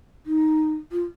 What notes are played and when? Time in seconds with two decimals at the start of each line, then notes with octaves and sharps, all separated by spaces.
0.26 D#4
0.92 F4